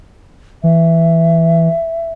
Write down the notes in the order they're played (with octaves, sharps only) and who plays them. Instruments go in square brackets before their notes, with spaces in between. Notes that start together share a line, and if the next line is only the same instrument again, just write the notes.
[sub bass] E3 [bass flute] E5